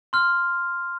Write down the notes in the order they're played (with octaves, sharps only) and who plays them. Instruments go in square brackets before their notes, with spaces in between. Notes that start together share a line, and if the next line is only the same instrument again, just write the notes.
[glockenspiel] C6 F6